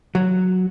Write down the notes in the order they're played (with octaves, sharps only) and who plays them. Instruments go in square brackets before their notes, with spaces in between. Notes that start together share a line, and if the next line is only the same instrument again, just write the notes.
[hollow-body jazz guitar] F#3